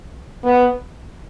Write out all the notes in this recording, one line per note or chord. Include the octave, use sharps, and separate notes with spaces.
B3